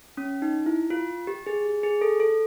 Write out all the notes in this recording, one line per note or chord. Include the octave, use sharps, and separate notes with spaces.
C#4
D#4
E4
F4
G4
G#4
G#4
A4
A4